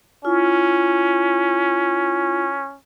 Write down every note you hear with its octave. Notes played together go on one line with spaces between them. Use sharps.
C#4 E4 F4